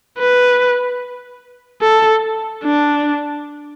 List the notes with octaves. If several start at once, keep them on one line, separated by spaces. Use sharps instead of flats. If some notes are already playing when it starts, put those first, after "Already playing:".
B4
A4
D4